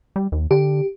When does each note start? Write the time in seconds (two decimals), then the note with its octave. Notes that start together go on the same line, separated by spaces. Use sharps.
0.16 G3
0.32 D#2
0.51 D3 G4